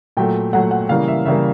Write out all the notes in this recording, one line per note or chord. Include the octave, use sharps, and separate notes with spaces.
A#2 F#3 A3 G5
A#2 F#3 A3 F#5
F#5
C#3 E3 G3 A#3 F5
E5
C#3 E3 G3 A#3 E5